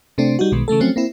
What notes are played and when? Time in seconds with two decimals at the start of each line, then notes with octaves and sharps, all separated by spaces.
0.18 C3 A3 C4 D4
0.39 G3 D#4 F#4
0.52 B1 B2 D#3 G#3
0.68 C#3 E3 A3 A4
0.80 F3 F#3 A3 C4 C#4
0.96 A#3 C4 E4